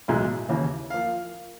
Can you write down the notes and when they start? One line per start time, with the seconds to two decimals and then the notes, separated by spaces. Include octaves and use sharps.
0.08 B1 A2 E3 G#3
0.49 D#2 C#3 E3
0.90 F3 A#3 F5